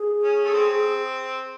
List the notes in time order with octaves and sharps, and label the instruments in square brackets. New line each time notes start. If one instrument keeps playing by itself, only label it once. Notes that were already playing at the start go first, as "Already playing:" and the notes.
Already playing: [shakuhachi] G#4
[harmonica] C#4
A3
C4